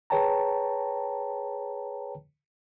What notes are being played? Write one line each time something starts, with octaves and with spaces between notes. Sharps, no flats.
G#4 B4 C#5 G5 A5 A#5